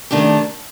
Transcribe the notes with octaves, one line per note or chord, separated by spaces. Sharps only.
C3 D#3 A3 D4 G4